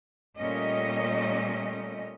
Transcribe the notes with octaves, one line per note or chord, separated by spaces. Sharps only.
A#2 G3 A3 C#4 D#5